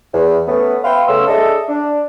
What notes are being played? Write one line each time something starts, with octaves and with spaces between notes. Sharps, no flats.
E2
A3 B3 C#4
B4 E5 F5 G5 C6
C#3 A3 B3 C#4 C6 E6
D4 G#4 A4 D#5 E5
D4